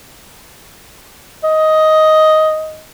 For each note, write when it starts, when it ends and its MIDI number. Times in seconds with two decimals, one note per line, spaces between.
1.44 2.83 75